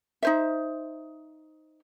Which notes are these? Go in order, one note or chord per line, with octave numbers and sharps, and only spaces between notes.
D#4 C5 E5